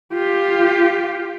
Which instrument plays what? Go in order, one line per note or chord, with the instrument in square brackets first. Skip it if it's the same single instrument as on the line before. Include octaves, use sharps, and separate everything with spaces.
[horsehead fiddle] F4 G4